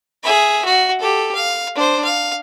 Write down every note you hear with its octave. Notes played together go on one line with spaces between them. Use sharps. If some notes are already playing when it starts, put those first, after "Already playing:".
G#4 E5
F#4
G4 A4
F5
D4 C5
F5